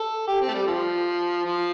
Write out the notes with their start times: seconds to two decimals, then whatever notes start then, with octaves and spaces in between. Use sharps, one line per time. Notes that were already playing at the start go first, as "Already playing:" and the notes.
Already playing: A4
0.27 G4
0.41 C4
0.48 A3
0.54 G3
0.67 F3
1.45 F3